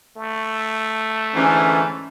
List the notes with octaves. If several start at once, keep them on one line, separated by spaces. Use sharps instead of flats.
A3
G#2 D3 E3 C#4